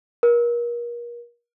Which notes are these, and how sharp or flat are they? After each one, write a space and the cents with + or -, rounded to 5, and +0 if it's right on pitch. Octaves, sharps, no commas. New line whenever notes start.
A#4 +35